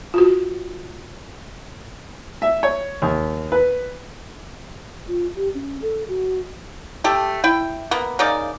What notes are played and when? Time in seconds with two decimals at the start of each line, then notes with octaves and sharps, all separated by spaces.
0.14 F4 F#4
2.42 E5
2.63 C#5
3.02 D#2
3.52 B4
5.08 F4
5.36 G4
5.54 C#4
5.82 A4
6.08 F#4
7.04 A3 G4 A4
7.44 E4 G5
7.91 A#3 B3
8.19 C#3 A#3 D#4 D5